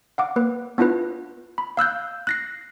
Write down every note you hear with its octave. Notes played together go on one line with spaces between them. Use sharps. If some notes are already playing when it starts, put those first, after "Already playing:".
F5 F#5 D6
A#3 B4
B3 D4 E4 F4 B4
B5
F5 E6 F#6 G6
F#6 A#6 C7